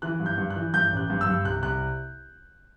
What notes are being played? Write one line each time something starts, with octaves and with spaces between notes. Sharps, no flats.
E3 F#6
G2
G6
G2
F#6
E3
G2 G6
A1
F#6
G2
E6
G2
C2 F#6
C2 F#6